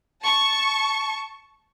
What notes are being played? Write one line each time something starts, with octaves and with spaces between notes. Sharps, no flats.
A5 C#6